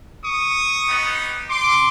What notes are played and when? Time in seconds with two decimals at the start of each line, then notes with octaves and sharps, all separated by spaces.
0.23 C#6 D#6
0.86 B3 D#4 G4
1.49 C6 D6